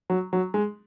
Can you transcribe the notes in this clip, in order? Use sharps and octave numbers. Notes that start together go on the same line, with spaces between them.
F#3
F#3
G#3